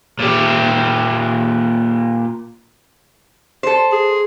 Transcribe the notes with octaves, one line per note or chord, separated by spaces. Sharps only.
A#2 G4
A4 C5
G#4